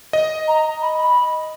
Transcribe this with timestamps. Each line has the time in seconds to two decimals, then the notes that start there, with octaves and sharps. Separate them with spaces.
0.13 D#5
0.48 A#5
0.82 B5
0.98 B5